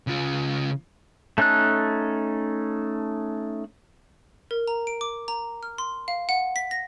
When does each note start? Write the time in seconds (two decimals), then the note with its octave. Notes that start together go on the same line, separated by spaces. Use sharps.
0.07 C#3 F4
1.38 A3 C#4 D#4 A4 F#6
4.51 A#4
4.68 A#5
4.87 D7
5.01 D6
5.28 A#5
5.63 F6
5.78 C6
6.08 F5
6.29 F#5
6.56 B6
6.71 A#6